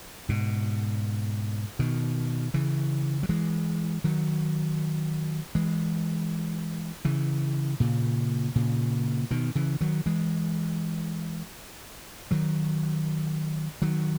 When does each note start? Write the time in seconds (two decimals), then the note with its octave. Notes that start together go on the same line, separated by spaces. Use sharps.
0.29 G#2 B2
1.79 B2 D#3
2.54 C#3 E3
3.23 F#3
3.29 E3 G#3
4.04 D#3 F#3
5.55 E3 G#3
7.05 C#3 E3
7.80 A#2 C#3
8.56 A#2 C#3
9.31 B2 D#3
9.55 C#3 E3
9.81 D#3 F#3
10.06 E3 G#3
12.31 D#3 F#3
13.82 D#3 F#3